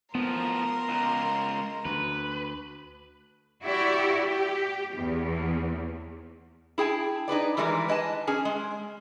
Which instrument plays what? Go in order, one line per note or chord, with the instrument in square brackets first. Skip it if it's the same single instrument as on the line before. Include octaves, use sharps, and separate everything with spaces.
[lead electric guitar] A2 F3 [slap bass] B3 [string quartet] A#4 A#5 C6
[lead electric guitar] C#2
[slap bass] D2 [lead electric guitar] B4
[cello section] E4 F#4 G4 D5
G4
E2
[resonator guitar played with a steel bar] E4 G#4 G5 A5
D#4 G#4 B4 D5
D#3 E3 G3 G#3 A#4 B4
B4 D#5 G#5 A5
C#4 G#4 G#5
G#3